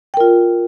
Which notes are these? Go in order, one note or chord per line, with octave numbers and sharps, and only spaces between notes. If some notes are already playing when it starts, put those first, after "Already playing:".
F4 A#4 G5